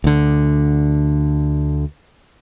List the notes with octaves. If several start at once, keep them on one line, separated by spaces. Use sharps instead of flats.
D2 D3